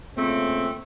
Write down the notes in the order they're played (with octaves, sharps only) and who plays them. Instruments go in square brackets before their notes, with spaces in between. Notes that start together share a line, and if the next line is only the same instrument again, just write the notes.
[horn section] A#2 C#3 A3 C4